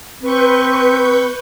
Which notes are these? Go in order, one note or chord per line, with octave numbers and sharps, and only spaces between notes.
C4 B4 C#6 G6